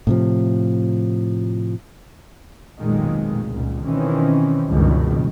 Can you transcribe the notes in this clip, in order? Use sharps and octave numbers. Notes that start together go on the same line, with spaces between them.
A2 C3 F3
F1 B1 A#2 D#3 G#3
C#2 A#2
B2 D#3 E3 C4 C#4
F#1 C#2 G2 B2 D#3